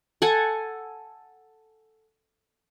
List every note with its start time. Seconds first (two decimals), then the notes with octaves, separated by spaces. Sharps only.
0.22 A4 F#5 G#5